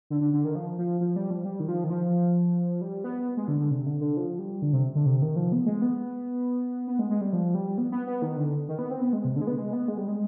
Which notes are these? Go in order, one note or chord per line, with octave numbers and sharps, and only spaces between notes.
D3
D3
D3
D#3
F3
F3
F3
G3
F3
G3
D#3
F3
D#3
F3
G3
B3
G#3
D3
D3
C3
D3
D3
F3
G3
D3
C3
D3
C3
D#3
F3
B3
G#3
B3
B3
G#3
G#3
G3
F3
G3
B3
B3
B3
D#3
D3
D#3
B3
C4
B3
G#3
C3
D3
G#3
B3
G#3
B3
G#3
G3
G#3